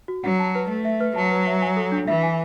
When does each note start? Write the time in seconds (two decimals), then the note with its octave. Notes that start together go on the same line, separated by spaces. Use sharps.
0.08 F#4
0.24 F#3 F#5
0.39 A5
0.55 B4
0.69 A3 B4
0.85 E5
1.01 B4
1.16 F#3 A5
1.31 B4
1.47 E5
1.62 G#5
1.77 A4
1.92 D4
2.08 E3 E5
2.23 G#5